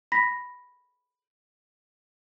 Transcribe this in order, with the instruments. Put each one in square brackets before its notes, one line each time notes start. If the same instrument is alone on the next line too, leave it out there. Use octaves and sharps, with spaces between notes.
[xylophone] B5 A#6 B6